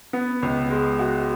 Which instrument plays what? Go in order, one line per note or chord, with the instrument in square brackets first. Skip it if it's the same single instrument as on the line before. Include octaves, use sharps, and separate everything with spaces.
[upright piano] B3
C#2
G#3
F#4